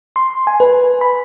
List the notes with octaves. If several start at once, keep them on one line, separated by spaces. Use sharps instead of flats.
C6
G#5
B4
B5